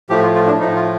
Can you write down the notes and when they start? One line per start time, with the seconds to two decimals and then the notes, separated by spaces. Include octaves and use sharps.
0.10 A2 F3 A3 G4
0.23 F4
0.35 F4
0.46 D4
0.59 A2 F3 A3 D#4
0.76 F4